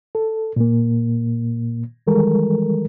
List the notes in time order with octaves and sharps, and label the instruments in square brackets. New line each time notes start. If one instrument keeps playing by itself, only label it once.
[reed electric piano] A4
A#2 A#3
D#3 E3 G3 G#3 A4 A#4